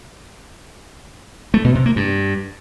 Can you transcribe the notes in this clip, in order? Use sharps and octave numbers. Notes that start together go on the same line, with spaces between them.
A3
B2
C3
A#3
G2